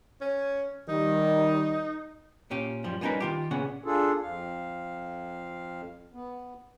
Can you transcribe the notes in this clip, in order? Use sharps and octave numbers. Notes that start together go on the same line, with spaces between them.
C#4
D#3 G3 D#4
A#2 C#4 G4
F#2 F3 G3
G3 B3 C#4 D#4 A#4 B4
D#3 F4 G4
A#2 C#3 B3 C#4 F#5
D4 F4 G#4 A4
F2 F5
B3